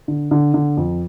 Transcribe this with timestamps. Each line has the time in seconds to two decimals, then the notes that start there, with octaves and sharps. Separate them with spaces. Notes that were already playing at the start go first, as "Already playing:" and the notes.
0.08 D3
0.31 D3
0.54 D3
0.77 F2